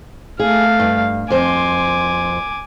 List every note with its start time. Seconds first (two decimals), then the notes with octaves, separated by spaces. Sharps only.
0.40 A3 G#4 F5
0.79 G2
1.30 F2 C5 G#5 D6